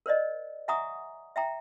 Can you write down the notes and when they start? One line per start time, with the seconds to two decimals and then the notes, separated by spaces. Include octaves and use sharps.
0.06 A#4 C5 D5 D#5
0.68 E5 F#5 G#5 A#5 C#6 D#6
1.36 E5 G5 A#5